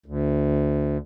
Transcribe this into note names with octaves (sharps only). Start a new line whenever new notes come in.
D2